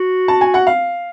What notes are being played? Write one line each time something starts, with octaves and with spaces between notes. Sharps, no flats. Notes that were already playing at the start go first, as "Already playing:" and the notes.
Already playing: F#4
A5
G#5
F#5
F5